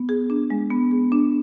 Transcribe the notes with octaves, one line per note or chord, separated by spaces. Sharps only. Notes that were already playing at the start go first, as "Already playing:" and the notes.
Already playing: B3
G#4
D4
G#3
B3
G#4
D4